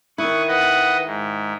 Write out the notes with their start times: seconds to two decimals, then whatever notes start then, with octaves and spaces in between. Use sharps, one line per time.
0.18 D#3 E4 C#6 D#6 F#6
0.48 B4 D#5 F#5
1.05 G#2